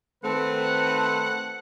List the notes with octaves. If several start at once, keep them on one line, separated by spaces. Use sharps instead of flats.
D#3 A3 C4 B4 F#5 A5